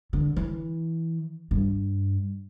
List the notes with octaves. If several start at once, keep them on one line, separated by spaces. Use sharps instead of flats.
D3
E3
G2